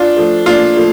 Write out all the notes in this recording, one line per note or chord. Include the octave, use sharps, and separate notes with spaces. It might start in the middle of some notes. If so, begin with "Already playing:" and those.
Already playing: D4 F4
F3 A3
A#2 D4 F4
F3 A3